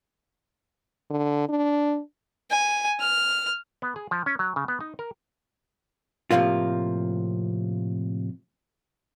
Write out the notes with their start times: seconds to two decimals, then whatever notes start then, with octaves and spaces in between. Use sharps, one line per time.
1.10 D3
1.49 D4
2.50 G#5
3.00 F6
3.82 B3
3.96 G#4
4.11 F3
4.26 C#4
4.39 F#3
4.56 C#3
4.68 B3
4.81 D#4
4.99 A#4
6.31 A2 C3 F3 A#3 F4